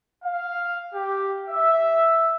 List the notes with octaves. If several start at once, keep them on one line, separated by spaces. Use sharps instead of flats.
F5
G4
E5